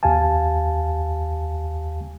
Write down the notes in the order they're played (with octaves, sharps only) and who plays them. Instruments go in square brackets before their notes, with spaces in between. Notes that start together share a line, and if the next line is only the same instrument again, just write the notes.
[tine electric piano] D#2 G4 F5 G#5 A5